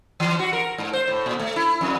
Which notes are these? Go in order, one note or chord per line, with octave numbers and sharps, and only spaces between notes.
E3
F#4
A#4
G#2
C5
A2
A#2
A3
E4
F2